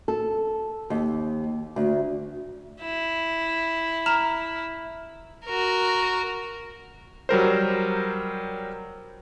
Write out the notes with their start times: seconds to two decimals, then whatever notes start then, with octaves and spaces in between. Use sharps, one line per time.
0.08 A4
0.90 D#2
1.76 D2
2.81 E4
4.06 A#5 F6 E7
5.45 F#4 A#4
7.29 F#3 G3 A#4 C5